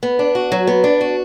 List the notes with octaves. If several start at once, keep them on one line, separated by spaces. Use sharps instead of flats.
B3
D4
F#4
F#3
B3
D4
F#4